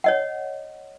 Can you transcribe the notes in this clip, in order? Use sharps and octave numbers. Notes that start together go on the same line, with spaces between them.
C#5 D#5 F#5